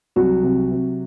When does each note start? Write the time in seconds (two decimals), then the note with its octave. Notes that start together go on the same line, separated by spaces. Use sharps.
0.16 C2 F#3 F#4
0.43 C3
0.71 C3